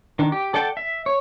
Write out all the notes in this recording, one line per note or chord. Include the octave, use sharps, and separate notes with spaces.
D#3 D4
G4
A4 D5 F#5 G5 A5
E5
C#5